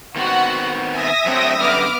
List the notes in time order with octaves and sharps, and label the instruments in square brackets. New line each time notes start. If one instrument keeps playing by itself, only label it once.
[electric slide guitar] D#3 B3 C4 [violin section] F#4 F#5
[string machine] E5 D#6 A#6 [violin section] G#5
[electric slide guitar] F#3 A3 D4 [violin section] C4 G5
[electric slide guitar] F#2 D3 G3 [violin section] B3 D6 F6